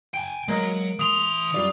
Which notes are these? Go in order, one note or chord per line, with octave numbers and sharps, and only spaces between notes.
G5 G#5 D7
F#3 G#3 A#3 D#5
E3 C6 D#6 F7
F#2 G3 F4 D5